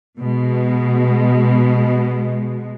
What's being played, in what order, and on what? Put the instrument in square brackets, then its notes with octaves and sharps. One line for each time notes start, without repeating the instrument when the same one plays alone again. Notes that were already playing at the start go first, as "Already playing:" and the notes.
[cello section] B2 G#3